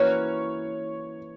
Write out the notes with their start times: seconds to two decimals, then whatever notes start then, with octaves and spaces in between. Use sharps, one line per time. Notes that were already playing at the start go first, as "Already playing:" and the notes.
Already playing: E3 A#3 C#4 F#4 C#5